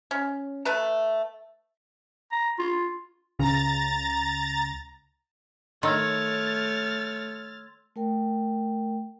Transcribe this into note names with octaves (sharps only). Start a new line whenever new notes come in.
C#4
A3 B4 A#5
A#5
F4
C#2 C#3 C#4 A#5 A6
D#3 A3 C#5 C6 E6 F6 G#6 A6
A3 A#4 G5